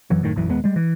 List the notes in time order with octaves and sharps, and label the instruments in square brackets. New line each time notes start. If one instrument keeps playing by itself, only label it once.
[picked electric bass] F#2 E3 F#3
F#2 A2 D#3
A#1 F#2 E3
D#1 D#2 G#3 B3
G3 G#3
E3